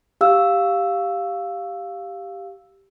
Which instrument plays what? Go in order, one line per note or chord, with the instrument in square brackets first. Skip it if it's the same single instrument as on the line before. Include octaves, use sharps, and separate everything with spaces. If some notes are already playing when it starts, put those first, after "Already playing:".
[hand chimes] G4 F5 E6